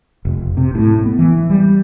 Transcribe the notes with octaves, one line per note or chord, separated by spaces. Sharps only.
F1
C3
A2
B3
E3
G3